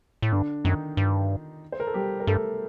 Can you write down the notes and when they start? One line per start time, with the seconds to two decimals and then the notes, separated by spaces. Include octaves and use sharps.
0.22 A2
0.32 G2 D3 D4
0.64 F#2 D#3 D#4
0.97 G2
1.72 C5
1.80 A#4
1.87 A4
1.94 G3 G4
2.20 A#4
2.27 G2 A3 A4